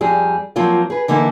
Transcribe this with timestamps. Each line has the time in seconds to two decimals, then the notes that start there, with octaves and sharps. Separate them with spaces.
0.01 F2 G3 G#4
0.56 F3 F#3 A#3 C4 F4
0.90 G#4 B4
1.08 D3 E3 A#3 D#4 E4 A4